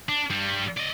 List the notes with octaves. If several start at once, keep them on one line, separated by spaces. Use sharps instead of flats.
D4
G2 G3
D5 D#5